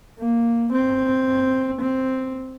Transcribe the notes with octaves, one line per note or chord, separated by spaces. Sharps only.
A#3
C4
C4